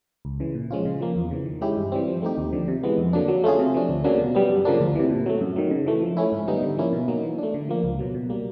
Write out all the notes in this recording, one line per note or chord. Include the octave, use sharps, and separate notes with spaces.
C#2
C#3 E3
A#2
F3 G#3 C#4 F4
C#3
F3 A#3
E2
C#3 E3
D#3
G#3 C#4 E4 G4
G2
E3 G3 C4
F3
A3 C4 D#4 G4
D#2
D3 F3
C3
E3 G#3 B3
F2
D3 F#3 A#3 D4
F#3
A3 C#4 F4 G#4
C3
F3 A3 D4
D2
C#3 F#3 A#3 D4
B2
G3 B3
F#2
C#3 F3 A#3 D4
D2
C3 E3
A#2
F#3 A3
F#2
D#3 F#3
C#3
E3 A3
F3
A3 C#4 E4
G#2
D#3 G3 B3 D#4
D3
F3 A#3 C#4 E4
B2
F#3 A#3 D#4
E3
A3 D4
D3
F3 A#3
C#2
B2 F#3
B2
G3 A#3